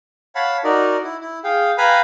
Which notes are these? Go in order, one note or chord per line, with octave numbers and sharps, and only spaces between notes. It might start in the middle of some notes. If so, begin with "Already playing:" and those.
C#5 F5 F#5 A5 B5
D#4 F#4 A#4 D5 D#5
E4
E4
G#4 F5 G5
B4 F5 G5 G#5 A#5 B5